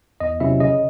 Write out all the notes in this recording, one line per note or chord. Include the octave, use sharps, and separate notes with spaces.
E2 D#5
C3 F#3 C#4 E4 E5
C#3 D#5